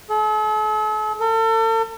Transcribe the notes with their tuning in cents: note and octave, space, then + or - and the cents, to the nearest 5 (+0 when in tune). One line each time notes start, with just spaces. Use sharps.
A4 -45
A4 +40